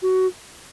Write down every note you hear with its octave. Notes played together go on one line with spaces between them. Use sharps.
F#4